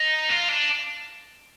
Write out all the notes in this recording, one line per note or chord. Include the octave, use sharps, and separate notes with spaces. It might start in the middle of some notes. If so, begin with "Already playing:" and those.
Already playing: D#4
F4
D4